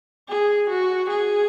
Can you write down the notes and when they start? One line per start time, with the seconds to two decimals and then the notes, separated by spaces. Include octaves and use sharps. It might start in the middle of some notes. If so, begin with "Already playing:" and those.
0.29 G#4
0.69 F#4
1.09 G#4